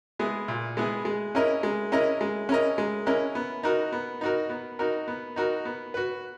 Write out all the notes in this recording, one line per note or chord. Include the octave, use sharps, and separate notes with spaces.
G#3 B3 E4 G#4
A#2
G#3 B3 E4 G#4
G#3
C#4 E4 A#4 D#5
G#3
C#4 E4 A#4 D#5
G#3
C#4 E4 A#4 D#5
G#3
C#4 E4 A#4 D#5
B3
D#4 F#4 A#4
B3
D#4 F#4 A#4
B3
D#4 F#4 A#4
B3
D#4 F#4 A#4
B3
F#4 B4